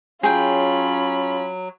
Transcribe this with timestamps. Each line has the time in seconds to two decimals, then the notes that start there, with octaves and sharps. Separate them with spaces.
0.23 F#3 C#4 F4 G#4 G5 B5